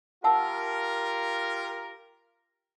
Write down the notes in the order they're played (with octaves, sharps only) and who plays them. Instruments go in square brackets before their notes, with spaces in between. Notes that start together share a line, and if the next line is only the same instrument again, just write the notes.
[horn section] F4 G4 A#4 [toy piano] F#5 A5 E6